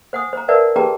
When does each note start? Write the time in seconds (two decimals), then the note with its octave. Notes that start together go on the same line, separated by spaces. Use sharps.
0.13 C5 F#5 G#5 D#6
0.33 C5 A#5
0.48 A#4 B4 D5 E5 F#5 A5
0.76 G4 G#4 B4 G5 A5 A#5